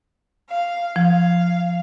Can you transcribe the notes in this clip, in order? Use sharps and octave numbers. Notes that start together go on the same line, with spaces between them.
F5
F3 F5